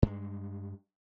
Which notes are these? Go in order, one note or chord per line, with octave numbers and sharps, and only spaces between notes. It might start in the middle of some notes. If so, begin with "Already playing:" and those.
G2 G#3